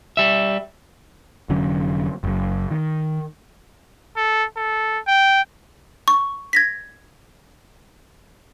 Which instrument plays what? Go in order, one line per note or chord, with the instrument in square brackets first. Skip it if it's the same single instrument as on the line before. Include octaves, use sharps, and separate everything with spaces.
[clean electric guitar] G3 E5
[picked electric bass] F1 D3 F#3 C#4
F#1 F#2
D#3
[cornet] A4
A4
G5
[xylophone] C#6
G#6 A#6 B6